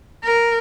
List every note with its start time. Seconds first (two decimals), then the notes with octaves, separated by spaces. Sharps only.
0.24 A#4